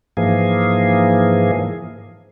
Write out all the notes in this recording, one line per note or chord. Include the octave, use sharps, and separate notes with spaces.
G#2 E3 F3 A#3 G#4